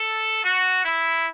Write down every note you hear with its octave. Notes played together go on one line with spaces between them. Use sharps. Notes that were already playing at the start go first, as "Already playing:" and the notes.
Already playing: A4
F#4
E4